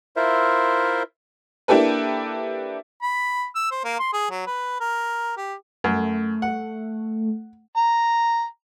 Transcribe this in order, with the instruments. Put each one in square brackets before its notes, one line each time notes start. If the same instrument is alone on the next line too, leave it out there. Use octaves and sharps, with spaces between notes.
[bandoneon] E4 F4 A#4 C5 E5
[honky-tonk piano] A#3 D4 E4 G4 A4 B4
[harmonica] B5
E6
C5
A#3
C6
G#4
F#3
B4
A#4
G4
[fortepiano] F#2 [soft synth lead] A3
[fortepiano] F#5
[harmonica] A#5